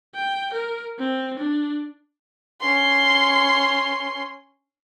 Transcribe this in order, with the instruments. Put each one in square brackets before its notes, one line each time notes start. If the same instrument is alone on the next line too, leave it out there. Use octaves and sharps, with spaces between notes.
[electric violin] G5
A#4
C4
D4
[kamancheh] C#4 C6